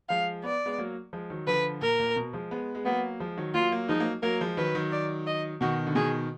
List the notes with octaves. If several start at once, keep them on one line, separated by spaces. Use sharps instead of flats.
F3 G#3 F5
B3 D5
G#3 B3
F#3 A#3
F3 G#3
D#3 F#3
D3 F3 B4
A#2 A#4
A#2
B2
F3 G#3
G#3 B3
G#3
F#3 A#3 B3
F3 G#3
D#3 F#3
F#3 A#3 F4
F#3 A#3
F3 G#3 D#4
F#3 A#3
F#3 A#3 A#4
F3 G#3
D#3 F#3 B4
D#3 F#3
D5
D#5
B2 D#3 F#4
D3
B2 D#3 G#4